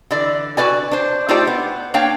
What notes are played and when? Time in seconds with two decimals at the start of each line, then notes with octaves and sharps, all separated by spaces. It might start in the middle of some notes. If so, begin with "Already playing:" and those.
0.11 D3 E3 D5
0.57 F#4 A4 B4 D5 G#5
0.91 D4 C5
1.29 A3 D#4 F4 G4 C5 D5
1.47 B3
1.94 A#3 D4 C#5 F5 G5